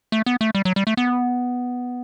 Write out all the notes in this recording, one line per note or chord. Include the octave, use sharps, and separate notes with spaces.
A3
B3
A3
G3
F#3
G3
A3
B3